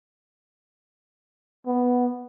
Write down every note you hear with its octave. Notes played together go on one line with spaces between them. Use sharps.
B3